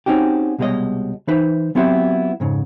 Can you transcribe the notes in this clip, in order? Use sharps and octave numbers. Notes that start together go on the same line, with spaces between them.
C4 C#4 D#4 F#4 G4
C2 B2 G3 G#3 C#5 D#5
E3 D#4 B4 C5
F#3 B3 C4 E4 F#4 G4
F2 G#2 C#3